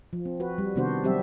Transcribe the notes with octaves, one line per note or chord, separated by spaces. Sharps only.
F3
C4
F#4 B4
G3
C3 D#3 B3 D4 F#4 C5
F#3 G3 C4 G4 E5